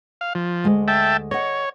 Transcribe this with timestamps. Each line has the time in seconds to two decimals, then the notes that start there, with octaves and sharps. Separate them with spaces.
0.21 F5
0.35 F3
0.64 D2 G#3
0.88 E5 G5 A5
1.31 C#5 D#5 F#5